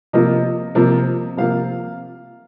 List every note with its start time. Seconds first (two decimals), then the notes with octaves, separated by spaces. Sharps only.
0.13 C3 F3 A#3 F4 D#5
0.75 C3 F3 A#3 F4
1.37 C3 F3 A#3 F4 F5